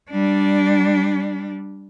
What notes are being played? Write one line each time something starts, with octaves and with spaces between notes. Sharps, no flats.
G3 D4